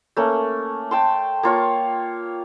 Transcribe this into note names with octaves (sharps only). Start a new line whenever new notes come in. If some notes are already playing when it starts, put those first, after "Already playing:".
A3 A#3 C#4
G5 A5 C6
A#3 F4 C#5